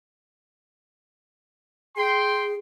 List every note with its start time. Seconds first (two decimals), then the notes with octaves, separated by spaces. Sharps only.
1.97 G#4 G5 C6